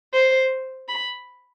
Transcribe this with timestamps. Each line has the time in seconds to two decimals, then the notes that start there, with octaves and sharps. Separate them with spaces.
0.14 C5
0.89 B5